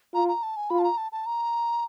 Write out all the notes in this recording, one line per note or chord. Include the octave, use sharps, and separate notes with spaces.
F4 A#5
A#5
A5
G#5
F4 B5
A5
A#5
A5
A5
A#5